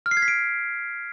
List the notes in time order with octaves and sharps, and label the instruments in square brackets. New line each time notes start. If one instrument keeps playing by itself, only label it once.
[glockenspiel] F6
C7
G#6
B6
D7